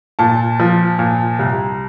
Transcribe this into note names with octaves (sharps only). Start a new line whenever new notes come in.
A#2 A5
F3
A#2
C2